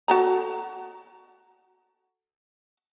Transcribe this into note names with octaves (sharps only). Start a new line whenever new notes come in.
F#4 A4 A#5